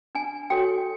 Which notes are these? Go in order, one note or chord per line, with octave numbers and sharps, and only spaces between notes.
D4 G#5
F#4 A4 C#5 G5